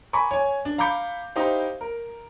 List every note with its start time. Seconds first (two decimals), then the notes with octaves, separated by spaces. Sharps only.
0.13 G#5 A#5 B5 C#6 D6
0.31 C#5 G#5
0.65 D4
0.78 F5 A#5 B5 D6 G6 C#7
1.36 D#4 E4 G4 C5 F5
1.81 A#4